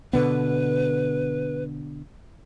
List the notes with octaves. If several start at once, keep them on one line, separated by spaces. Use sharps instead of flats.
B2 D3 B3 B4